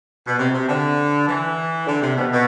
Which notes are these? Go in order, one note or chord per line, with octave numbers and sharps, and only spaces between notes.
B2
C3
C3
D3
E3
D3
C3
B2
B2